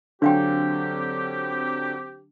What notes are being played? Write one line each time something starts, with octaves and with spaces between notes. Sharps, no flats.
D3 F#3 C4 D4 G4 F5 G5